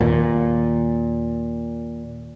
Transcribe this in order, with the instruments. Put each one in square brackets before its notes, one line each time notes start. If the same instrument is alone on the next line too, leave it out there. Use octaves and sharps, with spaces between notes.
[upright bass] D#2 [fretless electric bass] A#2